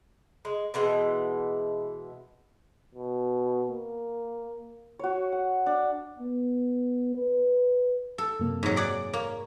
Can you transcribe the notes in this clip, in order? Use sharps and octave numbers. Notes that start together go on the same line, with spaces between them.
G#3
B2 E3 G#3
B2
A#3
F#4 C#5
F#5
D4
B3
B4
A4
F#2 C3 A#3
G#2 F#3
G#4 D5 F#5 D6 D7
A#3 C#5